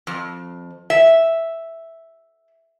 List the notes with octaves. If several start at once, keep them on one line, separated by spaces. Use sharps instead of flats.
F2
E5